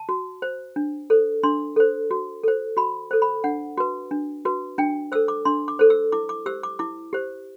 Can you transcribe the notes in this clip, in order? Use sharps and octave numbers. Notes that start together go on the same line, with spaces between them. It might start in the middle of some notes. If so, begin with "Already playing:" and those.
Already playing: A5
F#4
C5
D4
A4 C5
D4 C6
A4 C5
F#4
A4 C5
F#4 B5
A4 C5
B5
D4 F#5
F#4 B4
D4
F#4 B4
D4 G5
A4 C5 E6
D6
D4 C6
D6
A4 C5
E6
E4 D6
D6
G4 C5 E6
D6
E4 D6
G4 C5